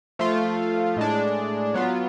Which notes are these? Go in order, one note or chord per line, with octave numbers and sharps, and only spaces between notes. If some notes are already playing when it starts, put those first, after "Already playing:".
F3 A3 F4
A2 G#3 D4
F#3 B3 F4